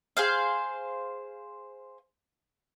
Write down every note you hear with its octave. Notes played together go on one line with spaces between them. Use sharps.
G#4 C5 F5